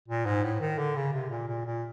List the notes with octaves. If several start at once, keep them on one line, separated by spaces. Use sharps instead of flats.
A#2
G#2
A2
D#3
D3
C#3
C3
A#2
A#2
A#2